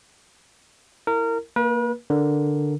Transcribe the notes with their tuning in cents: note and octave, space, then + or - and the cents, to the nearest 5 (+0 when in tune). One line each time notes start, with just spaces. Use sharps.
E4 +0 A#4 -25
A#3 +0 B4 -40
D3 +0 A#4 +0